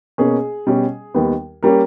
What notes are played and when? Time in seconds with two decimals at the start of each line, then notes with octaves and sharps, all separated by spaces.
0.18 B2 A#3 C#4 G#4
0.67 B2 G3 C#4
1.14 D#2 D#3 G3 B3
1.63 G3 A#3 C#4 A#4